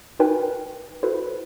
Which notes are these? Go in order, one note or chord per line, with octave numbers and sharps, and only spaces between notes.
D#4 F#4 A#4 B4 G5 G#5
E4 F#4 A4 B4 C5